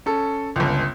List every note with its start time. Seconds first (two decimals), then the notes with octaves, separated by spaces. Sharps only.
0.06 C#4 A4
0.56 G1 C#2